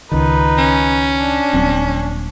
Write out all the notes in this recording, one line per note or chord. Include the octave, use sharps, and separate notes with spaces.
C#2 D#3 D#4 B4
C#4
D4
D#1 F#3 C4